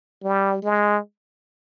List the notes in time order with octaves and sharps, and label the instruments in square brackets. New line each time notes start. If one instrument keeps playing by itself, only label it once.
[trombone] G3
G#3